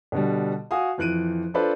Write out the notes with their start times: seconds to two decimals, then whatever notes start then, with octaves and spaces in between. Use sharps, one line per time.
0.12 B2 D3 G3
0.71 F#4 F5 G#5 D#6
0.98 F2 E3 F#6 D7 D#7
1.54 D4 F4 A4 B4 C5 D5